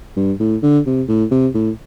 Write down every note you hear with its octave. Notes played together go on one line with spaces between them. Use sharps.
G2
A2
D3
C3
A2
C3
A2